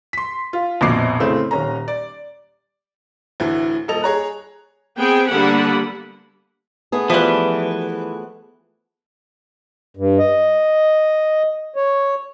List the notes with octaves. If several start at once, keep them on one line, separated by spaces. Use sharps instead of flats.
C6 B6
F4
A#1 F2 B2 D6 C7
A2 C#3 A3 C4
D#1 C#4 A#5
D5
D2 A2 E3
D#1 A4 D#5 F7
G#4 C#5 A#5 F#6
B3 C4 G#4 G5
D3 G3 A#3 B3 F#5 B5
A3 B3 G#4
E3 F3 G3 B4 F#6
G2
D#5
C#5